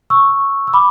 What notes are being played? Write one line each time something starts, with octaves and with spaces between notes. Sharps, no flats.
C#6 E6
E6
B5 D6